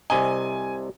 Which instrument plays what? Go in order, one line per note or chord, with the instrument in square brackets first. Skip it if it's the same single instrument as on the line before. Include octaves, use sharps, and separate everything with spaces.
[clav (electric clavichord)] C2 C3 D#5 [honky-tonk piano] G#5